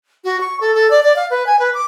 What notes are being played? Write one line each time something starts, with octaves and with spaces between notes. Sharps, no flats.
F#4
C#6
A4
A4
D5
D5
F5
B4
G#5
B4
D6